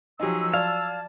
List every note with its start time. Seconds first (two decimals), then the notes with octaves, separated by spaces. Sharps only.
0.20 F3 F#3 D#4 G4 G#4 E6
0.54 D5 F5 A5 G#6